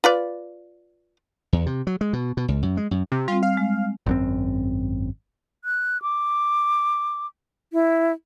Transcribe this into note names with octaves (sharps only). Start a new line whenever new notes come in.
F4 B4 D5
E2
C3
F#3
G#3
B2
B2
C#2
F#2
G#3
F#2
C3
G3 C4 F4
F5
G#3
G#1 F#2 C4
F#6
D6
E4